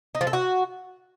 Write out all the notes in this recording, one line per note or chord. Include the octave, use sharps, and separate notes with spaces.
D#4
F3
A4
F#4